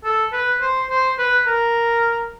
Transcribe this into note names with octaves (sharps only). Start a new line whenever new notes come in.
A4
B4
C5
C5
B4
A#4